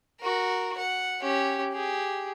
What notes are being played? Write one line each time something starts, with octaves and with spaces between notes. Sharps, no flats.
F#4 A#4
F#5
C#4 G4
G4 G#4